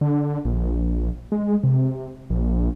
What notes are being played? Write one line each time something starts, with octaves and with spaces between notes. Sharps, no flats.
D3
A#1
G#3
C3
A#1